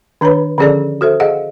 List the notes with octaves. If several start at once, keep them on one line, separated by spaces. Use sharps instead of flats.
D#3 D4 B4 C#5 B5
D3 F3 C#4 G#4 A4 D5
F#4 A4 C5 E5
G#4 D#5 F5 F#5